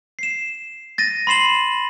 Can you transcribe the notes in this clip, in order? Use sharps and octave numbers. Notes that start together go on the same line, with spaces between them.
C7 E7
A6 A#6 D#7
B5 C6 C7 E7 F#7